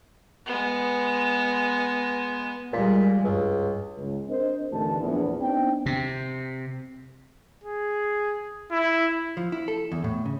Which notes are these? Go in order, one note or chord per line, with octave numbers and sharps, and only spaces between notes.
G#3 B3
A#2 G3 G#3
C#2 G2
C#2
C4 D4 A#4 C5 D#5
A1 D#2 A2 D3 E3 A5
A#1 E2
B3 C4 D4 D#4 G5
C3
G#4
E4
F3
E4
A4
E2
A2
C#3